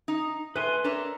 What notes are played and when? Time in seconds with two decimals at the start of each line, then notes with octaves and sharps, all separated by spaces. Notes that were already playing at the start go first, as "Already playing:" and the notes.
0.08 D#4
0.56 A3 B4 G#5 C6
0.84 D4 A#4 C#5 E5